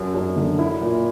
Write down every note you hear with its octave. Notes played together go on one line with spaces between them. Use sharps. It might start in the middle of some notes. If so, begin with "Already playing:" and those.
Already playing: F#2
F#2
D3
E4
A#2